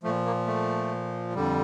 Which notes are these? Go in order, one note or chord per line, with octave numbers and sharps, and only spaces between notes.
A#2 F3 A3
A#3
A3
F2 D3 G3